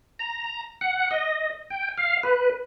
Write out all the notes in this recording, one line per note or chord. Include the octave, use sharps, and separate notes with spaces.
A#5
F#5
D#5
G5
F5
B4